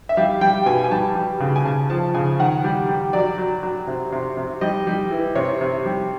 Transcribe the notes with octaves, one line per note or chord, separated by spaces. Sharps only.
E5
G3 F5
G3 G5
B2 G#5
G#5
G3 A5
G3
C#3
G#5
C#3 A5
F3 A5
C#3 G#5
D#3 F#5
G3
G3
F#3 D5
F#3
F#3
C3
C3
C3
G3 D#5
G3
E3
C3 C#5
C3
G3